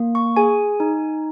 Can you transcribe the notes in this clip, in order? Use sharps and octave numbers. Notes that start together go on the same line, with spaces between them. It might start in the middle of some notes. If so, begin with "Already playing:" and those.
Already playing: A#3
C#6
G#4 G#5
D#4